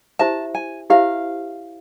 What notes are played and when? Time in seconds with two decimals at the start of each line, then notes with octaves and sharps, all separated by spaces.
0.19 E4 G4 C5 E5 A5
0.55 G#5
0.90 E4 G4 C5 E5 F5